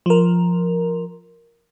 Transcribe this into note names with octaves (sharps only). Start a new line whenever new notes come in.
F3 A#4